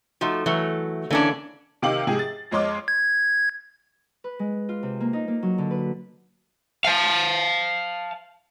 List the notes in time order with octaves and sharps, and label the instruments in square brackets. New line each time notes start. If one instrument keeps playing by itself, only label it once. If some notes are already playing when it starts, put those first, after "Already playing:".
[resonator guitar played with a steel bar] F3 A3 [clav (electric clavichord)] D#4 F#4
[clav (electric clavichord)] E3 [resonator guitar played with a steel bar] F#3 A3
[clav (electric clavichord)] D3 A#3 [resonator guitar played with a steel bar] E3 C#4 D4
[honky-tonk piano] C3 D#3 G4 F5 D6 F#7
G#2 C3 F3 G4 G#4
A6
F2 G#3 C#5 C6 D6 F6
[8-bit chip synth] G#6
[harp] B4
G#3
F4
C3
A#3
D#4
A#3
F#3
D3
B4
[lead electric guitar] F5 A5